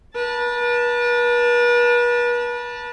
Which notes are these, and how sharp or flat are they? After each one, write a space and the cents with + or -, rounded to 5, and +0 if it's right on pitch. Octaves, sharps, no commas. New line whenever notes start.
B4 -40 A5 +5